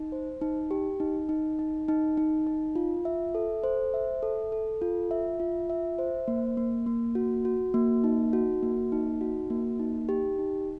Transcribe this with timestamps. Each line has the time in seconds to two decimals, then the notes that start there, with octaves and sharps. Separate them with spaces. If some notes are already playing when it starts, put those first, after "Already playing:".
Already playing: D#4
0.12 C5
0.41 D#4
0.71 G4
1.00 D#4
1.29 D#4
1.59 D#4
1.88 D#4
2.17 D#4
2.47 D#4
2.75 F4
3.05 E5
3.35 A4
3.63 C5
3.94 E5
4.22 A4
4.52 A4
4.82 F4
5.11 E5
5.40 F4
5.70 E5
5.99 C5
6.28 A#3
6.57 A#3
6.86 A#3
7.15 F#4
7.45 F#4
7.74 A#3
8.04 D#4
8.33 F#4
8.63 A#3
8.92 D#4
9.21 F#4
9.50 A#3
9.79 D#4
10.09 G4
10.39 D#4